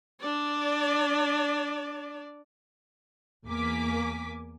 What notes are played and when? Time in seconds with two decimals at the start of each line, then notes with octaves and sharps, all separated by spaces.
0.21 D4 D5
3.46 E2 A#3 G#5 D6 B6